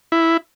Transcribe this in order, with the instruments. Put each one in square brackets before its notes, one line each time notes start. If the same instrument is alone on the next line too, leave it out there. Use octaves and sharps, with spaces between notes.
[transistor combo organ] E4